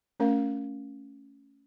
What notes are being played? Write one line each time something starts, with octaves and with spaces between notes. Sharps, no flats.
A3 C#4 A#4 F5